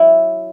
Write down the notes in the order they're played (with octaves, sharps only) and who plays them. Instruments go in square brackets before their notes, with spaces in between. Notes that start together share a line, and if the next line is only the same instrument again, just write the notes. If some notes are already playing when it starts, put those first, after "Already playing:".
Already playing: [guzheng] F#3 E4